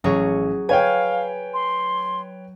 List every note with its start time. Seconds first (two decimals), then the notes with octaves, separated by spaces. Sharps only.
0.04 A1 F#3 G#4 C#5
0.69 B4 C#5 F5 G5 G#5
1.54 C6